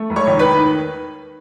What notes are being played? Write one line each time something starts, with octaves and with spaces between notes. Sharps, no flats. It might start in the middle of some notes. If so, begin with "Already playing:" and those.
Already playing: A3
E1
C#5 C#6
D#2
B4 B5
D#3